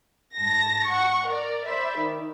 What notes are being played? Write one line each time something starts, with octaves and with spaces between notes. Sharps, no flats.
G#2 A5 A#6
F#5 C#6
A#4 D5
C5 D5 E5 B5
D#3